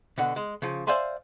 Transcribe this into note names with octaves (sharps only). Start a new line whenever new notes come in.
B2 D3 F#5
G#3
C#3 F3
C5 D5 E5 F5 G#5 C6